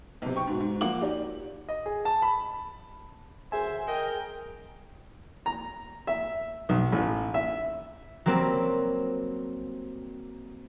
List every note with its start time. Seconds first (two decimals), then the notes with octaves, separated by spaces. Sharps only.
0.22 B1 C3
0.36 G5 C#6
0.47 G#2 B2 F#4
0.60 G#2
0.81 F3 A#3 F#5 D6 F#7
1.01 D#4 F#4 G4 D5
1.69 D#5
1.86 G#4
2.05 A5
2.22 B5
3.52 F#2 D3 G#4 C5 E5 G#5
3.87 A#4 D#5 G5
5.46 A#5
6.07 E5
6.69 B1
6.92 A1
7.34 E5
8.26 F#3 G3 A#3 C4